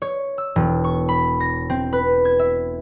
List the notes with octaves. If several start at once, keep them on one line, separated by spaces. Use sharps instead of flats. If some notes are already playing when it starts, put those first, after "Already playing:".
C#5
E6
E1
C#6
B5
A#6
C4
B4
G#6
E5